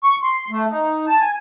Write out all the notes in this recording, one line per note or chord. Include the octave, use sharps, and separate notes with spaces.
C#6
C6
A3
D#4
A5
G#5